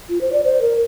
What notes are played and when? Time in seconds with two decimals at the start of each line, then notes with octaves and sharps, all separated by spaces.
0.09 F4
0.21 C5
0.32 D5
0.44 C5
0.61 A#4